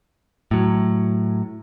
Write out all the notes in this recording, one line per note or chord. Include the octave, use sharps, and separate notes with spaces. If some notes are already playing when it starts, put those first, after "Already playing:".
A2 F#3